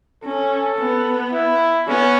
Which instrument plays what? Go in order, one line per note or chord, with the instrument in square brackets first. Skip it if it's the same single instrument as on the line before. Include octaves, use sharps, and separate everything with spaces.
[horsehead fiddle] C#4 [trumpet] A4
[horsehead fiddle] B3
[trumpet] E4
[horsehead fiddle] B3 [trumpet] C#4